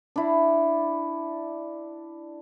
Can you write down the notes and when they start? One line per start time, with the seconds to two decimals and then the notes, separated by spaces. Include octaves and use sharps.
0.16 D4 E4